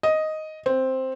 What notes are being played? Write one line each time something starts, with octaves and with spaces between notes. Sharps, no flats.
D#5
C4